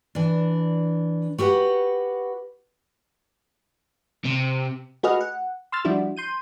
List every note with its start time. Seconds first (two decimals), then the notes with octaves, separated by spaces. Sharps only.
0.15 E3 D4
1.38 F#4 G4 B4 D#5 F#5
4.25 C3
5.03 A3 F#4 G#4 B4 D#5 F6
5.21 F#5
5.72 C6 E6 F6 A6
5.85 F3 G3 D4 E4 F#4
6.17 C6 G6 D#7